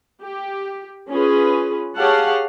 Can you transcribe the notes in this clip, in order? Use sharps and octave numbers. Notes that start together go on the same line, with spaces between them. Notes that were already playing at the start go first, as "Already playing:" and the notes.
G4
C#4 F4 G#4 B4
G4 G#4 C#5 F5 F#5 A5